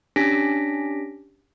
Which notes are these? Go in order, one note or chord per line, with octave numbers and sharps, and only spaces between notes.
C#4 D4 G4 A#6 B6 D7